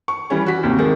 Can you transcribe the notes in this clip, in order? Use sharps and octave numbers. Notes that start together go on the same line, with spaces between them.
C#6
E3 G3 C#4
F#4 B6
D#2 C3
C3 D#3 G#3